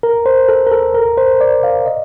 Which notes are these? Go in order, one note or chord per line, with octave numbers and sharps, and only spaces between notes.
A#4
C5
A4
A#4
A4
A#4
C5
D5
F5
D#5